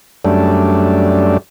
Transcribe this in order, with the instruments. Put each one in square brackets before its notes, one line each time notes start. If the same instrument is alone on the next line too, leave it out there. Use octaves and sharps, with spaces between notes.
[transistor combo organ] F#2 G3 A3 D4